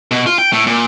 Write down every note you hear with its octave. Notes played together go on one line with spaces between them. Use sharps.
B2
F4
G5
A2
A#2